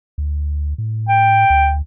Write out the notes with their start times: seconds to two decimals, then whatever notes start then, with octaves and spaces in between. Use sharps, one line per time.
0.18 D2
0.78 A2
1.09 G5
1.50 D2